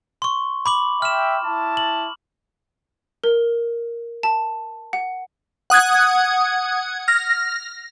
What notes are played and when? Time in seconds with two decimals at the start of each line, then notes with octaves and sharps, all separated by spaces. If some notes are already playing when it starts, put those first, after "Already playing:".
0.22 C6 C#6
0.66 B5 D6 F#7
1.02 E5 G5 F6 E7
1.44 E4 A5
1.77 F#7
3.24 A#4
4.23 A5
4.93 F#5
5.70 F#5 D#6 F#6 G#6
7.08 F6 A#6